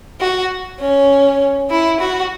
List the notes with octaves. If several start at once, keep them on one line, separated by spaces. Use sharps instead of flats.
F#4
C#4
E4
F#4